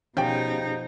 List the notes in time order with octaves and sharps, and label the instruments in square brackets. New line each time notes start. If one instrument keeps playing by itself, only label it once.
[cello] B2 D#4 [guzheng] F3 [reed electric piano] C#4 G4 G#4 [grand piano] G5 G6